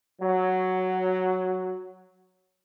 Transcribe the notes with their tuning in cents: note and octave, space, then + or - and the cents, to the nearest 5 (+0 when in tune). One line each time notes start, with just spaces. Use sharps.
F#3 +0